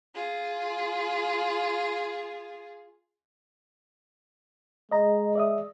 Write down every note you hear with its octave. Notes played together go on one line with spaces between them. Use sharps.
F4 G#4
G#3 D#5 A#5
D5 E5 D#6